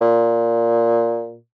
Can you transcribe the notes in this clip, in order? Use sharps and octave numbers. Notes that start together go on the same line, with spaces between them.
A#2